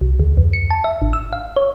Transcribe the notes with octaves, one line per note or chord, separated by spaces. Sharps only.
C2
D2
F2
C#7
A5
E5
G#1
E6
F5
C#5